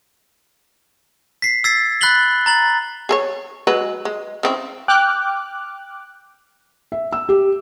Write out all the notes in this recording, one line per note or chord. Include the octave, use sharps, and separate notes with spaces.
B6 C7
E6 G#6 A6 B6 C7
B5 F#6 A6 B6 F#7 G7
A#5 A6 F#7
G#4 A4 C#5
F#3 G#3 B4
G#3
C#3 C4 E4
G5 D6 F6 F#6
E5
E6
G4